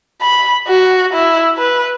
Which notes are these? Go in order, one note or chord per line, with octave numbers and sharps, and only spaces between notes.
B5
F#4
E4
B4